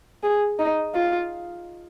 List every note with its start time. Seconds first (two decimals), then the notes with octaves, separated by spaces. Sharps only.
0.23 G#4
0.59 D#4
0.94 F4